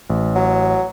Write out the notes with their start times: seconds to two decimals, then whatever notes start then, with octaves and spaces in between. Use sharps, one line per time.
0.10 A1
0.35 F#3